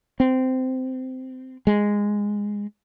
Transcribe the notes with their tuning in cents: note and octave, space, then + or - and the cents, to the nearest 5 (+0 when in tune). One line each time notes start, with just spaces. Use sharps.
C4 -15
G#3 -10